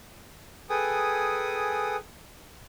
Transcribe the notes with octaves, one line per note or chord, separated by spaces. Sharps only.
G#4 A4 B4 G5 G#5 D#6